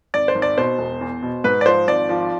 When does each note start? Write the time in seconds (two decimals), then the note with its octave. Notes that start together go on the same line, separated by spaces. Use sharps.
0.14 G#1 D5
0.28 C5
0.35 G#1
0.42 D5
0.57 B2 C5
0.79 E1
1.01 E2
1.22 B2
1.44 G#2 B4
1.61 D5
1.66 F3 C5
1.87 G#1 D5
2.09 F3